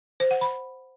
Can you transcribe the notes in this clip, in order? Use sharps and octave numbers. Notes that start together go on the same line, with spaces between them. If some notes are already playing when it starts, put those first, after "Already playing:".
C5
F#5
B5